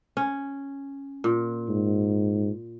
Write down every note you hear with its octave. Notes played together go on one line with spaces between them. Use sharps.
C#4
A#2
G#2